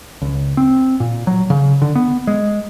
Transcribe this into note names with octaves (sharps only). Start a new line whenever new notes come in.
C#2
C4
A#2
F#3
C#3
D3
B3
G#3